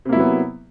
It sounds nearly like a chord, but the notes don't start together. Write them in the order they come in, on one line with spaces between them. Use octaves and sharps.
C3 A#3 E4 F#3 B3